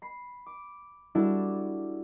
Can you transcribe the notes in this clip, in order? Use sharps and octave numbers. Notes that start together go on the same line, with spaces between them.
B5 C7
D6
G3 D4 E4 F#4 A4